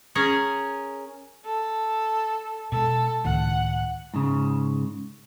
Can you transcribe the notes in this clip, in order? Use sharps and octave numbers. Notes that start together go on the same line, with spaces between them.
C#4 G#4 A#4 C#5
A4
B2 G#3 A4
C#2 A2 D#3 F#5
G#2 C#3